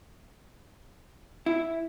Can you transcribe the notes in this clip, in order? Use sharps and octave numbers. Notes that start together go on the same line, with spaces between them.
E4